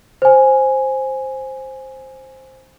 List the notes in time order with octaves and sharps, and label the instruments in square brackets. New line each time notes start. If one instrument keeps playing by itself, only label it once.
[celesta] C5 G#5